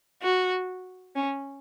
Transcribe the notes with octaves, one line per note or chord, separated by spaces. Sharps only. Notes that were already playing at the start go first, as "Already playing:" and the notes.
F#4
C#4